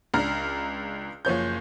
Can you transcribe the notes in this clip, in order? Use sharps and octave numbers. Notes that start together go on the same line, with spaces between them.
C#2 D4 A#5 F6
F#1 F3 C#5 G6